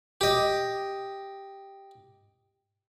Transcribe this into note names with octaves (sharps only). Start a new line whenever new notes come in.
G4 D#5